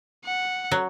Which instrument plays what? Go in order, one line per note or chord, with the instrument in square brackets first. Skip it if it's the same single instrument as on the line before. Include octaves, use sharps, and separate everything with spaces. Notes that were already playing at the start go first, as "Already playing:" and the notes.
[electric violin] F#5
[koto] F#3